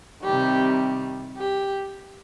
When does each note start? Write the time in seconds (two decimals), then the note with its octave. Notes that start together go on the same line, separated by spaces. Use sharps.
0.23 C3 D#3 G3 G4
1.37 G4